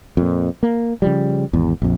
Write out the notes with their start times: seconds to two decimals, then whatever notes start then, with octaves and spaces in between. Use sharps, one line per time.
0.17 F2 A#2
0.63 A#3
1.02 C#3 F3 G3
1.53 G#1 E2
1.82 A#1 F2